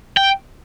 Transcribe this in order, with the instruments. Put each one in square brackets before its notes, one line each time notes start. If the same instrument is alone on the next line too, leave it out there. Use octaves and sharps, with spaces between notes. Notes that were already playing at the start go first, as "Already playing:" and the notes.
[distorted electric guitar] G5